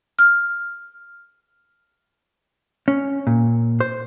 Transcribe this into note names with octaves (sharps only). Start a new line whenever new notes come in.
F6
C#4
A#2
C5